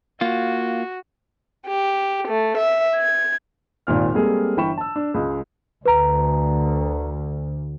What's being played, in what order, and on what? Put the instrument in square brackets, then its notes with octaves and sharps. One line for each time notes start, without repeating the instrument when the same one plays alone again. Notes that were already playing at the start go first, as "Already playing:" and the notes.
[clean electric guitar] A#3 F4 [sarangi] F#4
[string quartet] G4
A3
E5
G#6
[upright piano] G#1 D#2 A#2 F6
G3 G#3 A#3 C4 G#4 A4
G1 E3 G5 B5 C#6 E7
A5 E6
D4
C#2 G#3 D#6
[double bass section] D2 [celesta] B4 A#5